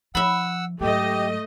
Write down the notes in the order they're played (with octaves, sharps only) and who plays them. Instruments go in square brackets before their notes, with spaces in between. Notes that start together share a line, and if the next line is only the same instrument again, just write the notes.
[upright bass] F3 [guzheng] E5 B5 [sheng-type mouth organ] F#5 E6
[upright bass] G#2 F#3 [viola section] A3 D#5 [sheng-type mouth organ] G4